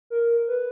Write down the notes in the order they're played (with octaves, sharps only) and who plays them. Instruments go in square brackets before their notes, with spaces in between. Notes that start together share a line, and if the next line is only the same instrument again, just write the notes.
[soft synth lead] A#4
B4